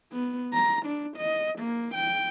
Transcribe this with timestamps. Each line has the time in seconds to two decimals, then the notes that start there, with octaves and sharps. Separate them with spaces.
0.12 B3
0.54 A#5
0.86 D4
1.17 D#5
1.59 A#3
1.95 G5